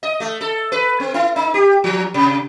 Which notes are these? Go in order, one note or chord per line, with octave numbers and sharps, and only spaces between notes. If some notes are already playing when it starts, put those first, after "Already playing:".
D#5
A3
A4
B4
C4
E4
D#4
G4
F3
C3